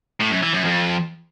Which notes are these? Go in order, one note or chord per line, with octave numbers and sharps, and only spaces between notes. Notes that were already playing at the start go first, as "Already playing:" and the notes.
A2
F#2
E3
F#2
F2